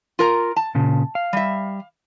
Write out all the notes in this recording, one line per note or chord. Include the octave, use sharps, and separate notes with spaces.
F4 A#4 A#5
A5
A#2 C#3
F5
G3 E5